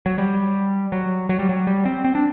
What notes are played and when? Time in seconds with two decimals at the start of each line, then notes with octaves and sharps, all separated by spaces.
0.06 F#3
0.18 G3
0.92 F#3
1.29 F#3
1.39 G3
1.49 F#3
1.67 G3
1.85 C4
2.04 C4
2.15 D4